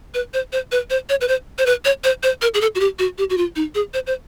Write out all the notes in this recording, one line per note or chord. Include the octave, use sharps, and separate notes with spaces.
B4
C5
C5
B4
C5
C#5
B4
C5
C5
B4
C#5
C5
C5
A#4
G#4
A4
F#4
G4
F#4
G4
F#4
F4
D#4
G#4
C5
C5